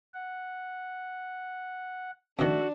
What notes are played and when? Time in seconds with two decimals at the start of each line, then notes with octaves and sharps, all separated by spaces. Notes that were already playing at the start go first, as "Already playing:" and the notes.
0.14 F#5
2.39 F2 D#3 A3 D4 F#4 A4 E5